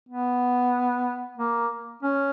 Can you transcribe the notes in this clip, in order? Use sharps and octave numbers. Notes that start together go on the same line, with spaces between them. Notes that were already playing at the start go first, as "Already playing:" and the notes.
B3
A#3
C#4